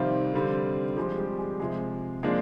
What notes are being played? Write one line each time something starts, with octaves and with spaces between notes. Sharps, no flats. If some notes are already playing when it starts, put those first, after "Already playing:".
Already playing: C3 D#3 F3 G3 C4 F4
D3 G3 C4
F3 G3 G#3 C4 G4
G3 G4
G#3 G#4
C3 F3 G#3 G#4
F3 G#3 A#3 D4 G#4